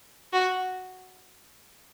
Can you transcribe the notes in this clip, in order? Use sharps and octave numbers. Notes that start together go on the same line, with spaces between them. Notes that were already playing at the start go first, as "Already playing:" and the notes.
F#4